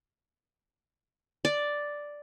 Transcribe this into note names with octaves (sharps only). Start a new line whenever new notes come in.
D5